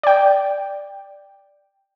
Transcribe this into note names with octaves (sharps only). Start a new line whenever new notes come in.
D5 G5